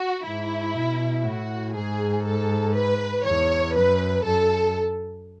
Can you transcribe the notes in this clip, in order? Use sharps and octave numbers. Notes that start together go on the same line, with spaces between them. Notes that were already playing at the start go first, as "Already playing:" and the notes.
Already playing: F#4
G#2 E4
B2
A2 F#4
G#2 G#4
A4
B4
E2 C#5
F#2 B4
F#2 A4